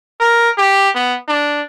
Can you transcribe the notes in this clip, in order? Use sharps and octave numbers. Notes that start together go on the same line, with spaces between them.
A#4
G4
B3
D4